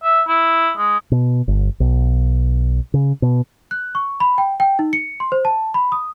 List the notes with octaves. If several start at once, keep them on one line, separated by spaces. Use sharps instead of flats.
E5
E4
G#3
B2
G1
B1
C#3
B2
F#6
C#6
B5
G5
G5
D#4
C#7
C6
C5
A5
B5
D#6